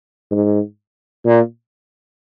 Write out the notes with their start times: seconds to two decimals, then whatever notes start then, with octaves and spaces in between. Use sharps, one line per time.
0.31 G#2
1.25 A#2